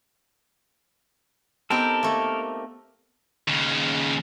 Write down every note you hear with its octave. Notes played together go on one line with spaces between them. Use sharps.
B3 C4 D#4 G4 A4 A#4
A3 A#3
D#2 C#3